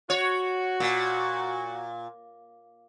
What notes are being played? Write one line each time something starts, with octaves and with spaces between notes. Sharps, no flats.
F#4 C#5
A#2